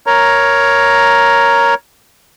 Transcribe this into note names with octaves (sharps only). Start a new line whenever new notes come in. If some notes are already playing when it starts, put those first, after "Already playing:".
A#4 C#5 A#5